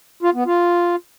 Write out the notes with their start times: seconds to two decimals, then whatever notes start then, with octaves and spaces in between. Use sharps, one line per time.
0.23 F4
0.34 B3
0.46 F4